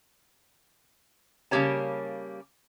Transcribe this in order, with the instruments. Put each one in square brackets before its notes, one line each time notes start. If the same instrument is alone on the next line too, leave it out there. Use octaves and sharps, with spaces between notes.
[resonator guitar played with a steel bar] C#3 G3 A#3 G4 C#5 A5